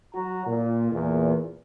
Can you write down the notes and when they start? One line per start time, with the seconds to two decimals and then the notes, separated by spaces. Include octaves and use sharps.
0.15 F#3 F#4 A#5
0.47 A#2
0.91 E2 A#2